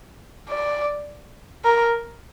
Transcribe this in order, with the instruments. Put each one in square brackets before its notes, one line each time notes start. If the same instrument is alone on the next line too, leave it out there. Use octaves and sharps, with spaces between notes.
[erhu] D5
A#4